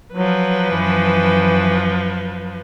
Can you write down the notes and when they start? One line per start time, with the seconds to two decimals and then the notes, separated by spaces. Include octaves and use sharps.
0.13 F3 F#3 B4
0.71 F#2 E3